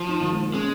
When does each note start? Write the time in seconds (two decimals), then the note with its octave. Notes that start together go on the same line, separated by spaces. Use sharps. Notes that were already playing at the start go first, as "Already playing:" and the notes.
Already playing: F3
0.09 D#4
0.21 D#3
0.32 G#3
0.43 A#3
0.53 G#3 C#4